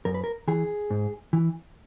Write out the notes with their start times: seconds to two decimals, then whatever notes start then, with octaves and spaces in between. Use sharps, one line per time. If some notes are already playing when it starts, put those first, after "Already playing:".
0.05 F#2 A#4
0.14 B4
0.24 A#4
0.48 E3 G#4
0.90 G#2
1.33 E3